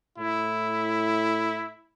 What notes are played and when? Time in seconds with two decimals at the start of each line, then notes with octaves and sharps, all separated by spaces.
0.18 A2 E4